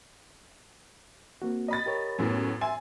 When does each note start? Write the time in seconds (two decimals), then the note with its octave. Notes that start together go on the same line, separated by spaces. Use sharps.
1.42 A#3 C4 F#4
1.68 D#5 B5 A6
1.86 G4 A#4 C#5
2.19 F#2 A2 B3
2.61 E5 G#5 C6 A6